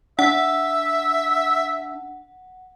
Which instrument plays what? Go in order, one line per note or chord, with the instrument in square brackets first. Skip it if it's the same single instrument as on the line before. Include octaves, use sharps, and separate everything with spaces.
[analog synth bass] D4 [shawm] E5 [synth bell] F#5